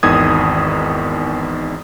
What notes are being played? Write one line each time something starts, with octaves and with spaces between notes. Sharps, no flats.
G#1 E2 D#3 D#6 G#6